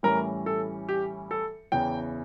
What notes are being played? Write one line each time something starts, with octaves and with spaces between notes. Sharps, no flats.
A2 E3 G3 C#4 A#4
A4
G4
A4
E2 C#3 E3 G5